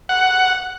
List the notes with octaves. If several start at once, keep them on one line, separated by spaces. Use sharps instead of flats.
F#5